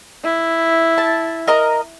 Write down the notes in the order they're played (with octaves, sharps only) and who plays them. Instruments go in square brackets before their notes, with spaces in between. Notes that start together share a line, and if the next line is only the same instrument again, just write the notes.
[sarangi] E4
[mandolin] A5
A#4 D#5 A#5